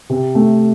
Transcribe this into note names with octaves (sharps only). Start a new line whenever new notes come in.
C3
A3